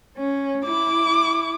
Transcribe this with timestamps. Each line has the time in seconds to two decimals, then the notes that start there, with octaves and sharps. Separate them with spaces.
0.17 C#4
0.66 E4 D6